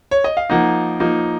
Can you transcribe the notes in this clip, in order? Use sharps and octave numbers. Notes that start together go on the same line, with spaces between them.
C#5
D#5
F5
F3 A#3 D#4 F#5
F3 A#3 D#4